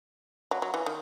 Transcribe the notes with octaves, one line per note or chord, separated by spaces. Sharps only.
F#3
F#3
E3
D#3